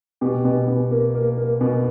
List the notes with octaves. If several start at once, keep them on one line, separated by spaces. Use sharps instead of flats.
B2 G4
B2
B2
A#3
A#3
A#3
B2